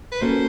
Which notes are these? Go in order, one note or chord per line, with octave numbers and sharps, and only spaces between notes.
B4
A#3 C#4 F#4 A4 C5